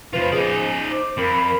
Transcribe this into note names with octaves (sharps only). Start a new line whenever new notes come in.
C3 F3 F4 B4
D#4 G#4 D5
C5 D6
F2 A#4 B5